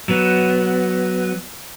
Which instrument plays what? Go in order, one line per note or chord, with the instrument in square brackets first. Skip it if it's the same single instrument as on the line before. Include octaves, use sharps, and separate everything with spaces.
[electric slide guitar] F#3 B3